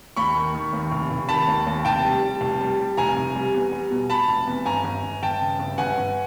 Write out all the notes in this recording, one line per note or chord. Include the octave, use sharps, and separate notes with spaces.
D#2 B5 C#6
D#3
D#3
D#2
F1
F1
D#3 A5 B5
D#2
D#2
F1 G5 A5
G3
G3
F1
G3
G3
F1 G#5 A#5
F1
G3
E2
G3
B2
B2 A5 B5
F1
E2
G1 G#5 A#5
G1
G1
G1 G5 A5
C#3
G1
G1 F#5 G#5
G1